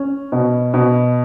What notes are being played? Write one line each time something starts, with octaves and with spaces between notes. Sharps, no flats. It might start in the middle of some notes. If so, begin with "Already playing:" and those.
Already playing: C#4
B2
B2